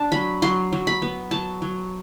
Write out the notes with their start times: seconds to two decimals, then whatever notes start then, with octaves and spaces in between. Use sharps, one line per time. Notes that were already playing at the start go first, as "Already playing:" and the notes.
Already playing: D4 A5
0.12 F#3 B5
0.42 F#3 C6
0.73 F#3
0.87 B5
1.02 B3
1.31 F#3 A5
1.62 F#3